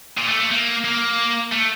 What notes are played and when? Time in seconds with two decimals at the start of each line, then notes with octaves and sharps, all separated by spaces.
0.18 A#2
0.28 A3
0.40 A3
0.51 A#3
0.85 A#3
1.52 A3